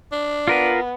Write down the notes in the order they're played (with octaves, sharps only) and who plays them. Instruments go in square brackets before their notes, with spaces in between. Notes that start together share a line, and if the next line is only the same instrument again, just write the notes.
[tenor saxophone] D4
[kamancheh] B3 [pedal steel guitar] F4 A#4 B4